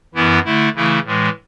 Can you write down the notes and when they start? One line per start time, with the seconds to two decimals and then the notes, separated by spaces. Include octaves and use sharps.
0.15 F#2 E3 B3 E4
0.44 D3 A3 E4
0.76 C#3 E3 A3 E4
1.05 A2 E3 G#3